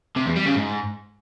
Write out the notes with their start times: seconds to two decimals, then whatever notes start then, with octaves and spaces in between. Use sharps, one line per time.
0.17 C3
0.26 E2
0.36 G3
0.46 C#3
0.56 G#2